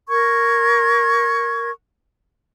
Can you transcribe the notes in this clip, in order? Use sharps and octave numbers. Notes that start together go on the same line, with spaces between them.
A#4 C#6 G#6